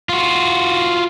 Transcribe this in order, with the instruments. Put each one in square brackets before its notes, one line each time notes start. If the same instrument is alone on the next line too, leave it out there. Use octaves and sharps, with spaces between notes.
[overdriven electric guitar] F4 F#4